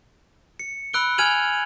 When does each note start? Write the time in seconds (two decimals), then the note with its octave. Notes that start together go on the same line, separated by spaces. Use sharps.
0.59 C#7
0.93 B5 E6 F#6 D7 G7
1.18 G#5 F6 G#6 D#7 F7 F#7